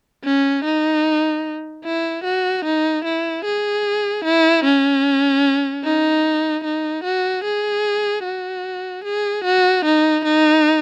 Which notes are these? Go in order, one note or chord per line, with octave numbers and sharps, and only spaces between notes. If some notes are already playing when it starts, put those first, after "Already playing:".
C#4
D#4
E4
F#4
D#4
E4
G#4
E4
C#4
D#4
D#4
F#4
G#4
F#4
G#4
F#4
D#4
D#4